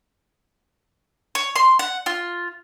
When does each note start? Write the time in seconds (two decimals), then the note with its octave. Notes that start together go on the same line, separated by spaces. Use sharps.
1.35 C#5
1.56 C6
1.79 F#5
2.06 F4